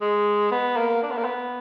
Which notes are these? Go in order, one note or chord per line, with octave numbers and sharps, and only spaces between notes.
G#3
B3
A#3
D4
B3
A#3
B3